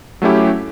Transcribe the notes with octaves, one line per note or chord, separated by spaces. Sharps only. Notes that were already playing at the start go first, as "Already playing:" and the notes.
F#3 A3 C#4 E4 G4